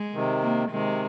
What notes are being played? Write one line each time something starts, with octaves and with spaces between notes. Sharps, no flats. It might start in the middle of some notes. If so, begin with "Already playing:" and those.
Already playing: G#3
C3 D#3
A#3
C3 D#3 G#3